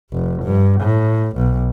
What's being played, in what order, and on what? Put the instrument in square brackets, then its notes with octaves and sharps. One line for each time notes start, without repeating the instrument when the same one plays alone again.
[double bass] F1
G2
A2
B1